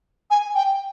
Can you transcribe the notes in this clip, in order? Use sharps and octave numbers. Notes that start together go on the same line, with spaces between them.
G#5
G5